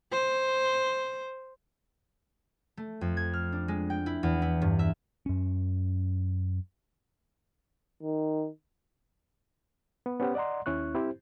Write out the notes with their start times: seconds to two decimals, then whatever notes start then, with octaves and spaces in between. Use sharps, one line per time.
0.11 C5
2.77 A3
3.01 F2
3.17 G#6
3.33 F6
3.52 D4
3.68 G#3
3.90 G5
4.06 E4
4.23 E2
4.42 E4
4.62 G2
4.79 E5
5.26 F#2 C#4
8.03 D#3
10.06 B3
10.20 B3 C#4 G4 C5 F#5
10.35 D5 D#5 F#5 A#5 C6
10.66 D#2 C#4 E4 C#6 F#6
10.95 C4 E4 G4 C5